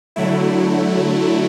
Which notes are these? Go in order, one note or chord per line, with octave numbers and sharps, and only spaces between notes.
D3 F#3 A3 E4